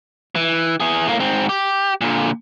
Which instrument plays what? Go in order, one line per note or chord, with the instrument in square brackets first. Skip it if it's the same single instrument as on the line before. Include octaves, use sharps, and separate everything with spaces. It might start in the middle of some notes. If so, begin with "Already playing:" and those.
[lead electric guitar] E3
E3 G#4
A2 A#3
G#2 C4
G4
A#2 D3